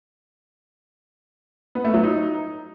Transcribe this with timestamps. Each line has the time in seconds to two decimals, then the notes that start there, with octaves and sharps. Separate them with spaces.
1.75 B3
1.85 A3
1.94 F#3
2.03 D#4